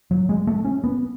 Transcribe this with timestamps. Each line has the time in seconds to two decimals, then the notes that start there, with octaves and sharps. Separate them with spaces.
0.11 F#3
0.29 G#3
0.47 A3
0.65 C#4
0.84 B3